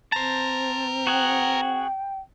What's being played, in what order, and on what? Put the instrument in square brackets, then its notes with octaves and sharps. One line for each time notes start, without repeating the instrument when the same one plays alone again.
[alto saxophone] C4 [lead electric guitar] B4 A#5 [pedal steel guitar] C5 A5
[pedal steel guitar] F#4 G#4 F#5 [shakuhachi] G5